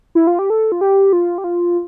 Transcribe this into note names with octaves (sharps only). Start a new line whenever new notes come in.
E4
F4
G4
A4
F4
G4
F4
G4
F4